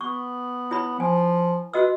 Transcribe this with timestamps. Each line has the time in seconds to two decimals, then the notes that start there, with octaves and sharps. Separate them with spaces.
0.01 B3 C#6
0.71 E4 C#5 B5
1.00 F3 G#5
1.73 F#4 B4 D#5 E6